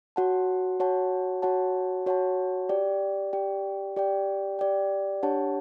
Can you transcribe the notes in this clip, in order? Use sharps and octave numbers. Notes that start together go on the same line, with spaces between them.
F#4 C#5 F#5 A5
F#4 C#5 F#5 A5
F#4 C#5 F#5 A5
F#4 C#5 F#5 A5
G4 D5 G5
G4 D5 G5
G4 D5 G5
G4 D5 G5
D4 G4 C#5 F#5 A5